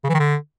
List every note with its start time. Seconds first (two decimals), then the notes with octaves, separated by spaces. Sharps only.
0.04 C#3
0.09 E3
0.14 D#3
0.19 D3